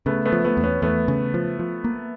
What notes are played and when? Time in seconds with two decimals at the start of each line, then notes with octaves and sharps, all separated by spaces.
0.06 C#3 A3 B3
0.25 A3 B3
0.32 F3
0.44 A3 B3
0.57 E2
0.64 B3 C#4
0.82 E2 A3 B3
1.08 C#3
1.34 F3
1.59 F3
1.84 A#3